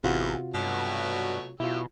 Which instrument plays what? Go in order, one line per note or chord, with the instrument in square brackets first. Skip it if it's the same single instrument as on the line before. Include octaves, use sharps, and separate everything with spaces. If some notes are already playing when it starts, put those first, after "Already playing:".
[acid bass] A1 [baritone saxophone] E2 [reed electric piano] C3 F4 F#4
[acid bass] G2 [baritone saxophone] B2 [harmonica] F#3 A3 C#5
[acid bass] B2 [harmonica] F#3 G4 E6 [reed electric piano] E4 F4